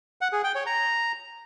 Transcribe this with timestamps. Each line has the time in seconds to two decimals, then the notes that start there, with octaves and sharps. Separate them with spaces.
0.21 F#5
0.32 G#4
0.44 G5
0.55 C#5
0.66 A#5